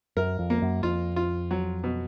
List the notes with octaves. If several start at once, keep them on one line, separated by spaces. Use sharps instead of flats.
F#2 A#4
F2
A#3
F#2
F2 F4
F4
F#3
B2